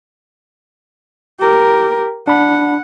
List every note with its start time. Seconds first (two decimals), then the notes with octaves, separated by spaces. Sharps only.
1.40 G4 A#4
2.28 D4 F#5 B5